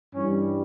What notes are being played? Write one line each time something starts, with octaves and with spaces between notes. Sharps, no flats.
G2 E3 G3 C#4